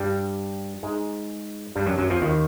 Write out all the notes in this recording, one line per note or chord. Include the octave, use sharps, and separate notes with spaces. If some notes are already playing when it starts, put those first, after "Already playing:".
Already playing: G2 G3
G#2 G#3
G2 G3
F#2 F#3
F#2 F#3
F2 F3
D#2 D#3